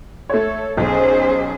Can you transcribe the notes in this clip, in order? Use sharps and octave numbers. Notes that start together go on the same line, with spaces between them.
A3 A4 C#5
B1 C#4 G#4 C5